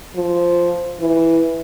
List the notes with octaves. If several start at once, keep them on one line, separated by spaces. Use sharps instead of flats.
F3
E3